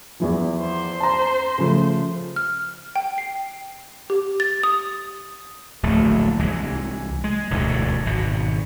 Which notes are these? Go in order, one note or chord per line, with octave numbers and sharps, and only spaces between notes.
E2 E3 F3
C5
A5 A#5
C#3 F3 A3
F6
G5
C7
G4
A6
D#6
D1 A#1 A3
C2 E3 G#3
G#3
E1 D2 G2
G#1 B2